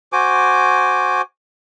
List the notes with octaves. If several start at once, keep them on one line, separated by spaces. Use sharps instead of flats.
F#4 C5 G#5 D6